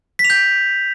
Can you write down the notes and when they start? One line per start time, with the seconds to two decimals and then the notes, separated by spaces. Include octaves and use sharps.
0.19 B6
0.25 F7
0.30 G6